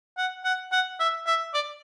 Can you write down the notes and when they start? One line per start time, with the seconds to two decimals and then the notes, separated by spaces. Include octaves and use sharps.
0.17 F#5
0.45 F#5
0.72 F#5
1.00 E5
1.26 E5
1.54 D5